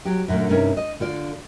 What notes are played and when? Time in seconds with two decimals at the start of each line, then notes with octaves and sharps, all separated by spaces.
0.05 F#3 G4
0.28 F#2 A#2 D3 A3
0.49 G2 C3 A#3 C#4 D#4
0.77 D#5
1.00 D3 F4 D5